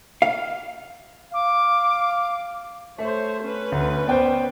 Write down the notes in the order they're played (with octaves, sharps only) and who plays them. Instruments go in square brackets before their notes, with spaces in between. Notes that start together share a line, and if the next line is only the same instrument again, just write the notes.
[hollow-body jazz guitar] F5
[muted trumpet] F5 [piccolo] D6
[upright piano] A3 [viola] C5 C#5
[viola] C#4 B4
[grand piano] D2
[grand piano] B3 C5 [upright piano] D5 G5